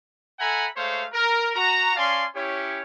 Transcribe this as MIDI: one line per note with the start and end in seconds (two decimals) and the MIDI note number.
0.39 0.67 69
0.39 0.67 76
0.39 0.67 78
0.39 0.67 80
0.39 0.67 82
0.39 0.67 83
0.77 1.04 56
0.77 1.04 57
0.77 1.04 72
0.77 1.04 73
0.77 1.04 77
1.13 1.50 70
1.55 1.94 66
1.55 1.94 82
1.96 2.26 61
1.96 2.26 74
1.96 2.26 77
1.96 2.26 80
1.96 2.26 81
1.96 2.26 84
2.35 2.83 61
2.35 2.83 64
2.35 2.83 67
2.35 2.83 73